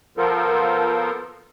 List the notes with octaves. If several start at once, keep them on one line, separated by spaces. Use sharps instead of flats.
F3 B3 F4 A4 A#4 C5